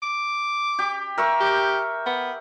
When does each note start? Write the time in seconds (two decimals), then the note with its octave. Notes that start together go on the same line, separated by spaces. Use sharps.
0.03 D6
0.79 G4
1.18 A#4 E5 C#6
1.41 G4
2.06 B3